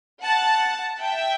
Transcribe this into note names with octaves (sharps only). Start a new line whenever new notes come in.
F#5 A5
E5 G5